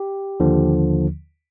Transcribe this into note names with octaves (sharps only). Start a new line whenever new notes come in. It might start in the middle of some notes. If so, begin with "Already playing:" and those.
Already playing: G4
D#2 D3 F3